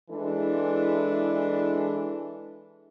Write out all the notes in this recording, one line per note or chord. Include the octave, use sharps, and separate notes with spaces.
E3 G#3 D4 E4 G#4 A4